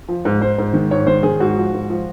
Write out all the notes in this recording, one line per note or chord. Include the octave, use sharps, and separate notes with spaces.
F3
G#2
G#2 C5
G#2
D#3
G#2 C#5
D#3 C5
D#3 G#4
G#2 F#4
F3
G#2
F3